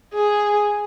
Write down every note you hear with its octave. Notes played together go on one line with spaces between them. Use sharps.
G#4